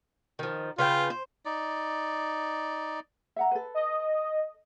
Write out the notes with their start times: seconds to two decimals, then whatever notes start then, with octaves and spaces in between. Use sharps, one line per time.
0.39 D#3 F3
0.78 C#3 F4 B4 G5
1.10 C5
1.45 D#4 D5
3.36 E5 F#5 A#5
3.51 A4 B4
3.74 D#5